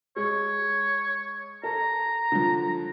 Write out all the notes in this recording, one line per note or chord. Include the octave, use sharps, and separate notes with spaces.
G#3 C#5
A4 A#5
D3 F3